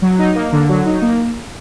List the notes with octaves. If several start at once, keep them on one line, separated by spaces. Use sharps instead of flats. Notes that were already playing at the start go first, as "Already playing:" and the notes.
F#3
D#4
A#3
D3
F#3
D#4
A#3